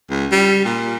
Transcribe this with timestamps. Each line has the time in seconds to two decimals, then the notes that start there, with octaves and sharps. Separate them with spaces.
0.10 C#2
0.32 G3
0.65 A#2